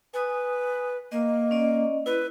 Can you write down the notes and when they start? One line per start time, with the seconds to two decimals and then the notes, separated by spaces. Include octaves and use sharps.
0.14 B4 G#5 D#6
1.12 A#3 D#5
1.51 C#4 D5 D#5
2.06 E4 B4